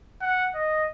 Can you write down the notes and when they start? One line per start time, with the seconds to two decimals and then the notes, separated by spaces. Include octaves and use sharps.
0.21 F#5
0.55 D#5